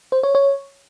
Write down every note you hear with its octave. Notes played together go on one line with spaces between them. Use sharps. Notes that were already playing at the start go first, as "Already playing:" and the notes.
C5
C#5
C#5